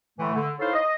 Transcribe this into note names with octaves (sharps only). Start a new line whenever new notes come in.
A2 D3 E3 A3
D3
D#4 E4 A4 C5 C#5 F5
D#5